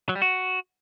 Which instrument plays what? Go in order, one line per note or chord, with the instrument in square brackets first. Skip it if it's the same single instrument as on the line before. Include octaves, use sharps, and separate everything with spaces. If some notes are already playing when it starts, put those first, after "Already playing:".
[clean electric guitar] F#3
G3
F#4